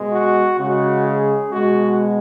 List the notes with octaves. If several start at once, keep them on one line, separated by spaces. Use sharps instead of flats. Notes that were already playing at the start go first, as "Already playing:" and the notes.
Already playing: B2 G#3
F#4
C#3 G#3 F#4
G#4
B2 G#3 F#4